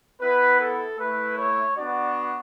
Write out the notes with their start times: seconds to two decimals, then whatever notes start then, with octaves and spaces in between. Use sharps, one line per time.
0.22 B3 E4 B4
0.61 A4
0.99 A3 E4 B4
1.38 C#5
1.77 B3 D4 F#4 D5